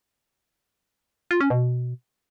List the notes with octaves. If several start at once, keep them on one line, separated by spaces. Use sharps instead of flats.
F4
C#4
B2